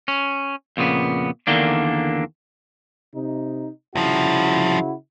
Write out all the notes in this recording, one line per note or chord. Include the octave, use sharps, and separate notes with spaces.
C#4
F2 A#2 C#3 B3
E2 D3 D#3 A#3 D4
C3 D#4
C2 C#3 F3 E4 F#4